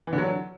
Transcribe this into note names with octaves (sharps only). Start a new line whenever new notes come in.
E3
D3
F#3